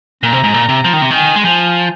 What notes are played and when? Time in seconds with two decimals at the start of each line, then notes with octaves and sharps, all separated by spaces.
0.23 A#2 A#5
0.33 C3
0.44 G#2
0.54 A#2
0.69 C3
0.84 F3
0.93 D#3
1.02 C3
1.10 D#3 G#5
1.36 G#3
1.45 F3 G#5